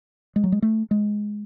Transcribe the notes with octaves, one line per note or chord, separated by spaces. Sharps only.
G#3
F#3
G#3
A3
G#3